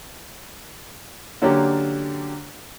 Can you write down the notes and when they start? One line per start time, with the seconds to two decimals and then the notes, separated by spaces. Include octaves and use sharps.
1.42 D3 F#3 A#3 C#4 D4 G4